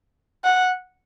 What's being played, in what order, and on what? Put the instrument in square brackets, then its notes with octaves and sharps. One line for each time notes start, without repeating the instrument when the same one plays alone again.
[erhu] F#5